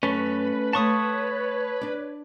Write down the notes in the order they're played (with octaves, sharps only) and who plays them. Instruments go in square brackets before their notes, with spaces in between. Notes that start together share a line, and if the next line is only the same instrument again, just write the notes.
[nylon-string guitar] F#2 [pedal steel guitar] A3 C#4 [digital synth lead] B4
[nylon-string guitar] A3 C5 F5 [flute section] C#5 [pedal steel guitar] A5 C#6 D#6
[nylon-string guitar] D4 D5